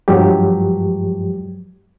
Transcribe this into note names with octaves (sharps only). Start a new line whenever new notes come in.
G2 F3 F#3 G#3 G4